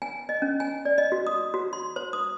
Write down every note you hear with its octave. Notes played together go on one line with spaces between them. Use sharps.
G#5
D#5
C#4
G#5
D5
D#5
F#4
D#6
F#4
C6
C5
D#6